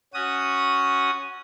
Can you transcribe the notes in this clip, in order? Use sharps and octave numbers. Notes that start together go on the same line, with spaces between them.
C#4 F#4 D#6